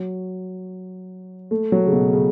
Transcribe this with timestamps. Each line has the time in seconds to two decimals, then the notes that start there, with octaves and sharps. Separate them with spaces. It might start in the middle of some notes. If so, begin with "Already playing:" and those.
Already playing: F#3
1.51 A3
1.72 F#3
1.87 C#3
1.93 B2
2.13 C#3